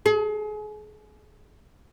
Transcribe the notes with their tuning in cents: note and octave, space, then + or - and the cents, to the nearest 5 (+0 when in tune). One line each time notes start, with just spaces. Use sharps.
G#4 +35